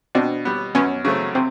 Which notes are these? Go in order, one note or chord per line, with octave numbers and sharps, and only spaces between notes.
B2 C4 D4
G3 B3
F#2 B3 C#4
C#3 F#3 A3 C4
C3 C4